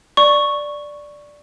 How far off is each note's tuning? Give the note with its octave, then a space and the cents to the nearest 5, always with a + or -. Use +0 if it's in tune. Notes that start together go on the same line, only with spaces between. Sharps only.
D5 +0 C#6 +0